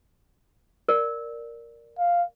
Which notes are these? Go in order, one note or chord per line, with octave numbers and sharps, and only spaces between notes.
A#4 D5
F5